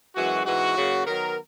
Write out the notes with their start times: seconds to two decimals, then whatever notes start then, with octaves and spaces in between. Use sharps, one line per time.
0.15 F#2 E3 G#3 F#4
0.45 G#2 E3 B3 F#4
0.75 C#3 F#3 A#3
1.05 D#3 F#3 B3 A#4